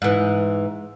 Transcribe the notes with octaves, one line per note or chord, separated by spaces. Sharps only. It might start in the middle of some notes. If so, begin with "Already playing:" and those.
G#2 E3